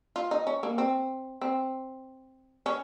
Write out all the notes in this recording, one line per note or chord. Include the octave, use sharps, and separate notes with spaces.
F4
D#4
C#4
A#3
C4
C4
C#4